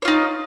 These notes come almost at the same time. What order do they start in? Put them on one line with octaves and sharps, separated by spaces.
C#5 F4 D#4